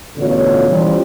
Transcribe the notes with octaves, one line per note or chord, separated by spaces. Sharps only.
A1 B2 D3 F4 C#5
E3 F3 G3 C#4 F4